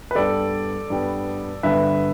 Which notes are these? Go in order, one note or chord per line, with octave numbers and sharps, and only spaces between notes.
B4
G2 G3 B3 A4 D5
G2 G3 B3
G2 D3 G3 B3 B4 E5